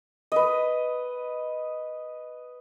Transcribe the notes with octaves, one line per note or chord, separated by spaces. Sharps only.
B4 D#5